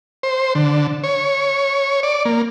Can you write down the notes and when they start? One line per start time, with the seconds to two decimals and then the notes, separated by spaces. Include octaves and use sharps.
0.23 C5
0.55 D3
1.04 C#5
2.03 D5
2.25 A#3